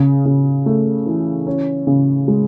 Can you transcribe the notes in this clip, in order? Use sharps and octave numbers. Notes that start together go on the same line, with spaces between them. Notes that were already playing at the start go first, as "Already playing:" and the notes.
Already playing: C#3
C#3
A3
E3
C#4
C#3
G#3